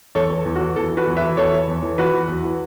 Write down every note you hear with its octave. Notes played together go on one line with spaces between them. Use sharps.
E2 A4 C#5
E3
E2
F#4
E3
E2 A4
E3 F#4 B4
E2
B4 E5
E3
E2 A4 C#5
E3
E2
E3
E2 F#4 B4
E3
E2
E3